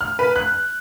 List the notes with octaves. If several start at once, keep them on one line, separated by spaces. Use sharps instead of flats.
F6
B4
F#6